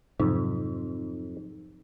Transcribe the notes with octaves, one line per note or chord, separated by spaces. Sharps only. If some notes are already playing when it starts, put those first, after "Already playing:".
F2 G#2 C3 F#3 D#4